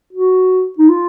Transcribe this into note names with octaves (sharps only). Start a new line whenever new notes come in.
F#4
D#4
F4